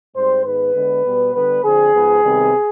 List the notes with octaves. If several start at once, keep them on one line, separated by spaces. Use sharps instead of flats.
G#2 G3 C4 C5
G#2 D#3 B3 B4
D3 G#3 B3
B2 G3 B3
D3 G3 B3 B4
D3 F3 C4 G#4
G#2 F3 B3
C3 D#3 G3 B3